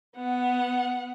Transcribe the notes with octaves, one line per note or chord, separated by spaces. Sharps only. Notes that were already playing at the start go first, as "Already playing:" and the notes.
B3 F#5